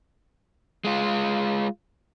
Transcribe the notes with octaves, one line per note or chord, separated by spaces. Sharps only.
G#3 F4